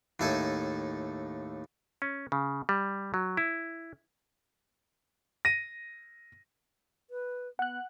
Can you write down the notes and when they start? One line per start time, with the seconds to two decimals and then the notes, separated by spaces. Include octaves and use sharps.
0.20 D#2 A2 A4 E5 G#5
2.02 C#4
2.32 C#3
2.69 G3
3.14 F#3
3.37 E4
5.45 A#6 D#7
7.10 B4
7.59 B3 F#5 F#6